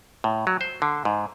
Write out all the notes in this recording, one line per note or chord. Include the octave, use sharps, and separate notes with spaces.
A2
F#3
C5
D3
G#2